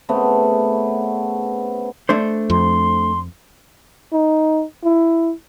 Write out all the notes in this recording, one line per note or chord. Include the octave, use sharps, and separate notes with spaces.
C#3 A3 B3 C4
A3 D4 C5
F2 C6
D#4
E4